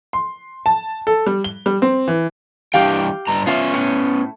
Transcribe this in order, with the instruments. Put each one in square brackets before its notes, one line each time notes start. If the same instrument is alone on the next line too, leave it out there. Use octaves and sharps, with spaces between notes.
[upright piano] C6
A5
A4
G3
G7
G3
C4
E3
[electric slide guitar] G2 E3 G5 [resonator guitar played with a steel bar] G4 F5
[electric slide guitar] G2 A#5
[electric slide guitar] B3 C#4 G#5 [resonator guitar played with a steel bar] F4 E5
[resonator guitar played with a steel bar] A2